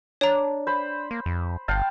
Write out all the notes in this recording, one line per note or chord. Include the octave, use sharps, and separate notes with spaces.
D4 C#5 A#5
C5 B5
A#3
F2
G1 F5 G5 A5